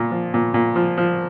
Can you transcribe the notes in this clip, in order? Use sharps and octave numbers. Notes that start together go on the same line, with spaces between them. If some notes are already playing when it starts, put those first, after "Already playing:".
Already playing: A#2 A#3
F3
A#2
A#2
F3
F3